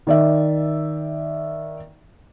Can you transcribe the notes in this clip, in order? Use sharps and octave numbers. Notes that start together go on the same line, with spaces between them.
D#3 D5 E5